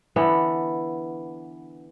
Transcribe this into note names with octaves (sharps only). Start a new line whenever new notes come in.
D3 E3 B3 D4